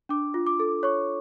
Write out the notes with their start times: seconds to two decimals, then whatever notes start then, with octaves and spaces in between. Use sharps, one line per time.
0.09 D4 D6
0.34 F4
0.47 D6
0.59 A4
0.83 C#5 C#6